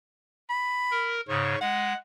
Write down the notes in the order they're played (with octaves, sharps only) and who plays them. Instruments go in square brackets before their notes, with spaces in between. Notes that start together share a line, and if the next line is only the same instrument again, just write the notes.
[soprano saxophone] B5
[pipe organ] A#4
[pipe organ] G#2 C#3 [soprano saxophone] C#5
[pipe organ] G#3 [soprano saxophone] F#5